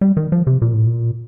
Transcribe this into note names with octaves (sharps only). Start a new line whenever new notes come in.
G3
D#3
F3
C3
A#2
A2
A#2